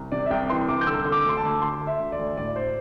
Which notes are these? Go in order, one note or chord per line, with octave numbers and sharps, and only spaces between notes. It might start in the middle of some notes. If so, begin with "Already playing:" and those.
Already playing: C2
C3 D5
E5
C2 G5
E3 C6
C2 D6
G6
D3 E6
D3
D6
D2 C6
A5
D2
D3 C6
D3
E5
D2
D5
D2
A2 D5
C5